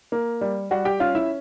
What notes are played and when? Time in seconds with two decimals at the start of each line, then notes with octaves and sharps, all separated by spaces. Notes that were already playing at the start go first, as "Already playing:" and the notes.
0.12 A#3
0.41 G3
0.71 G3 F#4 F#5
0.85 G4 G5
1.00 C#4 F4 F5
1.15 E4 E5